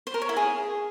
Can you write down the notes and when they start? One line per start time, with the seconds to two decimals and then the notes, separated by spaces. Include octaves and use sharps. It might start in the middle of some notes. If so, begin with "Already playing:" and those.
0.07 C5
0.14 A#4
0.22 C#5
0.29 E4
0.36 G#4